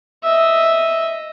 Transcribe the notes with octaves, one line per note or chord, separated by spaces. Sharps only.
D#5 E5